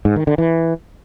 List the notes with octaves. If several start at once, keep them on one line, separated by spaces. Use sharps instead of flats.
G#2
D#3
D3
E3